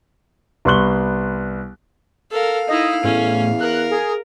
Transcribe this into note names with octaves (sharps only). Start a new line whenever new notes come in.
C2 B3 C6 C#6 F#6 G7
A4 A#4 F5
D#4 E4 D#5
E2 A2 C#4
A#4 F#6
G#4